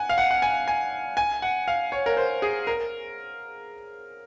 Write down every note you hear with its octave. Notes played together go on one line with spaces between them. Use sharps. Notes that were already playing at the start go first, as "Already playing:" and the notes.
Already playing: F#5 G#5
F5
F#5
F#5
G#5
G#5
G#5
F#5
F5
C#5
A#4
C5
G#4
A#4